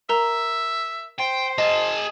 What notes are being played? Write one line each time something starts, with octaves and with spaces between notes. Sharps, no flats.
A#4 E5 A#5
C5 G5
G#4 D#5 A5